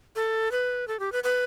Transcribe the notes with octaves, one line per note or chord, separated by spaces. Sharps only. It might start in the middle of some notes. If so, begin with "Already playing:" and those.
A4
B4
A4
G4
B4
B4